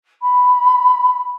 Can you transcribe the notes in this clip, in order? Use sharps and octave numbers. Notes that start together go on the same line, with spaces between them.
B5